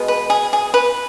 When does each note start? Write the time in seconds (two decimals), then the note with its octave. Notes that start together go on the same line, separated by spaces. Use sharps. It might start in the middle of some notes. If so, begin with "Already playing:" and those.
Already playing: B2 G#3 B3
0.08 B4
0.30 G#4
0.53 G#4
0.74 B4